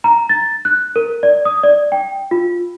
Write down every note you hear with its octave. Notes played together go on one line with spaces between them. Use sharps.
A#5
A6
F#6
A#4
D5
D#6
D5
G5
F4